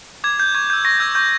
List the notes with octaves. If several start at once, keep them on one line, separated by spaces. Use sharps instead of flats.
D6 G#6
G6
C#6 G#6
G6
E6
C#6 A#6
E6 G6 G#6
C#6 G6